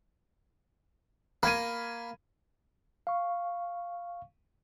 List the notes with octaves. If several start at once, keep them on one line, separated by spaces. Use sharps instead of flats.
A#3 B5 G#6 D#7
F5 C#6